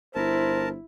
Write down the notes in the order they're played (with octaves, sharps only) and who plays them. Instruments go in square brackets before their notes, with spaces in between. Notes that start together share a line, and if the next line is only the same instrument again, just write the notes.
[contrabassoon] G1 [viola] E4 [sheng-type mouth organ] A#4 A5 [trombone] C5